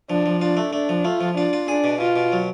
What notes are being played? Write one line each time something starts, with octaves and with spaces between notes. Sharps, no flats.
F3 D4
F3
D4 F4
A3
A3 D4
F3
A3 F4
F3
D4 F4
F4
D4 G#4
B2
B2 F4
B2
F#3